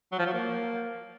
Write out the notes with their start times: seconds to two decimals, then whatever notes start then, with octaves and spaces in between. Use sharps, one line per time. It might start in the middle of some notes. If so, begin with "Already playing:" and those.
0.12 F#3
0.19 F3
0.26 F#3
0.33 A#3